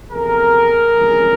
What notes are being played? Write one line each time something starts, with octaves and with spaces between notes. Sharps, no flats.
E2 C3 F3 A3 G#4 A#4
G1 F2 C#3 E3 G#3